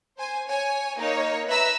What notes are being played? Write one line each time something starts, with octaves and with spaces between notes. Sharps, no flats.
C5 G#5
C#5 G#5
A#3 D#4 C#5
B4 E5 A#5 E6